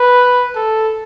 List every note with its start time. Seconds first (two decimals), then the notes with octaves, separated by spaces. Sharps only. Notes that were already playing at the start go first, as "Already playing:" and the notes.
Already playing: B4
0.55 A4